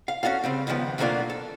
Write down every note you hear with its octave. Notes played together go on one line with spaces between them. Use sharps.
F5
C#4 D4 F#4 A4 F5
C#3 G3 C4
C#2 G2 D#3 F3 B3
B2 F#3 A3 A#3 D4 F4
A4